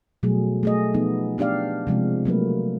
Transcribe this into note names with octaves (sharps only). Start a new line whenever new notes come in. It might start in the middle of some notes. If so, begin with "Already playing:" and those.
B2 F#3 G3 A3 G#4
A3 G#4 D#5
F3 B3 D#4
B3 D4 G4 D5 F5
C3 F3 G#3 C4
F#3 A3 A#3 B4